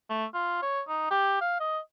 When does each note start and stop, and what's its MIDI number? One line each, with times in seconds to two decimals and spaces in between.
0.10 0.25 57
0.34 0.60 65
0.62 0.81 73
0.88 1.06 63
1.10 1.37 67
1.41 1.59 77
1.60 1.79 75